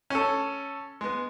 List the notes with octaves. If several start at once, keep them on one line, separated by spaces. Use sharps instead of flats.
C#4 A4
G#3 B3